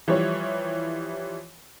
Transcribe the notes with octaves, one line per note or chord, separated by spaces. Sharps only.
E3 F3 G3 C#5